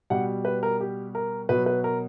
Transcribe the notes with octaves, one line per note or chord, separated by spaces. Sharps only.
B2 G3 F#5
B4
A#4
G4
A#4
B2 F#3 B4
B4
A#4